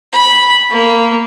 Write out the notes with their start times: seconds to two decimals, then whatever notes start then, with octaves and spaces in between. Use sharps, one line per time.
0.13 B5
0.71 A#3